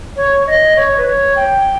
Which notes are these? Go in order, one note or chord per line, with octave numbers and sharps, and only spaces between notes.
C#5
D#5
C#5
B4
C#5
G5